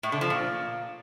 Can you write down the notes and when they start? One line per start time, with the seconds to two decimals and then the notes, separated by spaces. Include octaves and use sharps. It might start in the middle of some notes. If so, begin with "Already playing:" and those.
0.03 A2
0.12 D3
0.21 F3
0.30 A#2